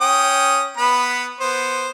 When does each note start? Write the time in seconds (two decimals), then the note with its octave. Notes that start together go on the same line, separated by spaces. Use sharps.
0.01 C#4 G5 D#6
0.78 B3 B4 B5
1.40 B3 C5